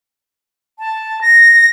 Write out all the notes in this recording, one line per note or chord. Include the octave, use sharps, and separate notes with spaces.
A5
A#6